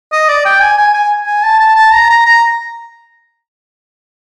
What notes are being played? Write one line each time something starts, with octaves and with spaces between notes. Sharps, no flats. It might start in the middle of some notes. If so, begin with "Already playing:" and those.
D#5
D5
G5
G#5
G#5
G#5
G#5
A5
A5
A5
A#5
A#5
A#5